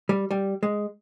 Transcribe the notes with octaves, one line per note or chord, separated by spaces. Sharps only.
G3
G3
G#3